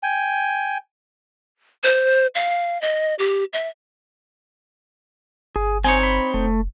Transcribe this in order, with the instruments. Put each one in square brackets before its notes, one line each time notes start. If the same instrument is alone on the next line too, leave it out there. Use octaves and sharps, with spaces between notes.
[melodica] G5 G#5
[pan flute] C5
F5
D#5
G4
E5
[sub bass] G1 [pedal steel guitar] G#4
[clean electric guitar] C4 D#4 C#5 [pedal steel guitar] G#5
[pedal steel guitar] B5
[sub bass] F1 [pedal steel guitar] A3